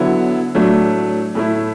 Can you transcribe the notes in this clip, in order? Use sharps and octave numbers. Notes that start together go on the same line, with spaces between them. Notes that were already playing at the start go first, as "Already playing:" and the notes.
Already playing: D3 F#3 B3 E4
A2 F#3 A3 D4
A2 A3 E4